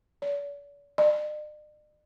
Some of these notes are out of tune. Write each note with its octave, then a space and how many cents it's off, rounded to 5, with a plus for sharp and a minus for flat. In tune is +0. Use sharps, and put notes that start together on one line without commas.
D5 -45
D5 +45